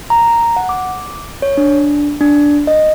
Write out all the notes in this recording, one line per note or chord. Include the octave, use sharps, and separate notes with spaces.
A#5
F#5
D6
C#5
D4
D4
D#5